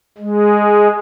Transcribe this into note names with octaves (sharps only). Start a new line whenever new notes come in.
G#3